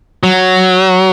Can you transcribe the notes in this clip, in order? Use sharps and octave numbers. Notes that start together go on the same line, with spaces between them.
F#3